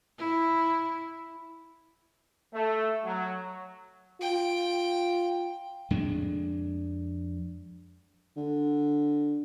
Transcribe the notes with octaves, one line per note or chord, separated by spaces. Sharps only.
E4
A3
F#3
F4 G5
F2 G#3 D4
D3